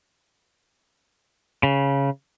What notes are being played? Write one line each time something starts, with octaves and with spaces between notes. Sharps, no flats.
C#3